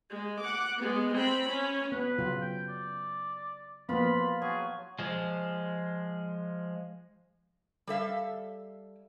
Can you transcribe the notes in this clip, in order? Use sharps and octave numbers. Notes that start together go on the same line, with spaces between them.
G#3
F#5 D6
G#3 B3
C4 B5
C#4
B3 B4
C#3 F#3 F4
G5
D5
F3 A#3 B3 F4 B5
F#3 G#4
F3 G#3
G3 A4 E5 F5